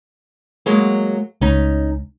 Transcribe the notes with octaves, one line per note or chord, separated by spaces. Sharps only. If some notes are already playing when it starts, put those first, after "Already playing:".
F#3 G#3 A#3
C#2 C#4 D#4